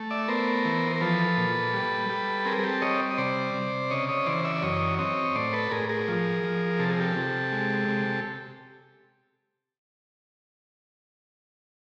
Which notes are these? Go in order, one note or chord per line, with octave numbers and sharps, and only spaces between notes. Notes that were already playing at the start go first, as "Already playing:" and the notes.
Already playing: A3
D5 E5
B3 A#4 C5
E3
A#4
F3 A4 B4
A#2
G3
G3
C4 G#4 A#4
G#4
G4 A4
G3 C#5 D#5
D#5
C3 C5 D5
C3
C#3 C#5 D#5
C#5 D#5
E3 C5 D5
D5 E5
D5
F#2 C#5 D#5
C4 C#5 D#5
A2 C5 D5
A4 B4
A2 G#4 A#4
G#4 A#4
F3
F3
C3 A4
G#4
G4 A4
C3
G#3
C3